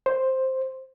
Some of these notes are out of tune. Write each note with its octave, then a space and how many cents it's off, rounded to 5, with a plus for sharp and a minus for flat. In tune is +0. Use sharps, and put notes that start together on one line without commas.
C5 +5